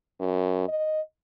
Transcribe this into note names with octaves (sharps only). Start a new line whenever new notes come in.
F#2
D#5